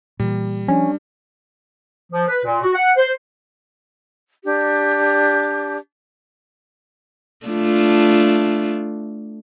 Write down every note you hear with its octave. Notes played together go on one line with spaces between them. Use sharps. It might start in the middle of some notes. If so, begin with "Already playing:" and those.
A#2 E3 G3
F3 C#4 D4
F3
B4
A#2
F#4
F#5
C5
D4 G4
A3 D4 F4